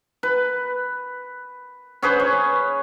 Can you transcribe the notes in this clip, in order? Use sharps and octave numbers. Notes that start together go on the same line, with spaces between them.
B4
C#4 G#4 B4 C5
C#5